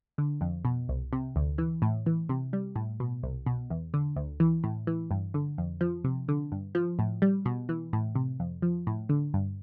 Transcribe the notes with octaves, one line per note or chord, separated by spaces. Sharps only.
D3
F2
B2
C2
C3
D2
E3
A2
E3
C3
G3
A2
B2
C2
B2
E2
D3
D2
E3
A2
E3
G2
D3
F2
F3
C3
D3
G2
F3
A2
G3
B2
E3
A2
C3
F2
F3
A2
D3
G2